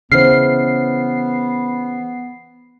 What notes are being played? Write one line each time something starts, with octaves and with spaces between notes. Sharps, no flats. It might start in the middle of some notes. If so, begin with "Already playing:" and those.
C#3 E3 B3 C5 F6 C7